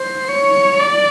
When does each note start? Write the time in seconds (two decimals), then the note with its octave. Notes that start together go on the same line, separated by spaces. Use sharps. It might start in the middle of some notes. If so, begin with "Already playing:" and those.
Already playing: C5
0.28 C#5
0.80 D5